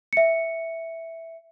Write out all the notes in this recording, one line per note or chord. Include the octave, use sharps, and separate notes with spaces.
E5 C#7